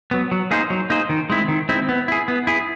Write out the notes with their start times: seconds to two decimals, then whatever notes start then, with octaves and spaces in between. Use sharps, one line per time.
0.11 F#3 B3
0.31 F#3
0.51 A#3 D#4 G#4 C5
0.70 F#3
0.90 A#3 D#4 G#4 C5
1.09 D#3
1.30 G#3 C4 E4
1.48 D#3
1.69 G#3 C4 E4
1.89 B3
2.08 E4 G#4
2.28 B3
2.47 E4 G#4